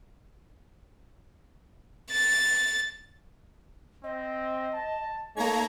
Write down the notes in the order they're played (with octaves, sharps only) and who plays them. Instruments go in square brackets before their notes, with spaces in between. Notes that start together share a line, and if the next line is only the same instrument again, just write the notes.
[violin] A6
[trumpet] C4 [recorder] D#5
[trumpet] A5
[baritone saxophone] A3 [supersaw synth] A#3 A#5 G#6 [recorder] D#4 [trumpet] C#5